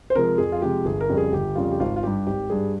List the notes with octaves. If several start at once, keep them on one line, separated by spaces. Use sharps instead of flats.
C5
C3 F3 G#3 A#4
F2 G#4
F4
C3 F3 G#3 G4
G1 G#4
A#4
F2 C#3 G3
G#4
G1 G4
F2 C#3 G3 F4
G4
G#1 F4
F4
G2 G3 G4
G#1 G4
G2 G3 G#4